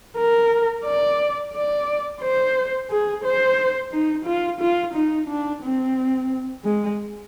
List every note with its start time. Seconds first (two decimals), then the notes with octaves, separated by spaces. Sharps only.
0.17 A#4
0.85 D5
1.54 D5
2.21 C5
2.90 G#4
3.24 C5
3.91 D#4
4.25 F4
4.61 F4
4.94 D#4
5.28 D4
5.63 C4
6.64 G#3